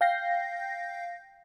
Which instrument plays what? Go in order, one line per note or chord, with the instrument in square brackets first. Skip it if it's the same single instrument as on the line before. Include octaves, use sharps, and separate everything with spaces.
[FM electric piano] F5 G5 G6 A#6 C7